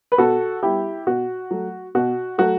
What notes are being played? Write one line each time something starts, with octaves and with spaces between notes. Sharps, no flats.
B4
B2 F#4 A4
G3 B3 E4 G4
B2 F#4
F#3 A3
B2 F#4
F#3 A3 F#4